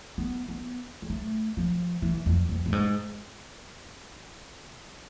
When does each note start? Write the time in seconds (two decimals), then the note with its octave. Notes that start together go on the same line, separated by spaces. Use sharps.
0.18 B3
0.49 B3
1.02 G#3
1.10 A3
1.57 F3
2.02 E3
2.26 F2
2.49 F2
2.66 A2
2.72 G#2